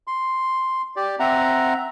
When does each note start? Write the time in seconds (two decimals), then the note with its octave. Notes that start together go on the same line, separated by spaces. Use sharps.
0.07 C6
0.96 G4 D5
1.20 C4 E5 F#5 A#5